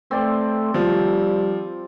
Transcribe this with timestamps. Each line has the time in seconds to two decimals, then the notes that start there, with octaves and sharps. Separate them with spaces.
0.11 A3 C4 D5 C6
0.74 F3 G3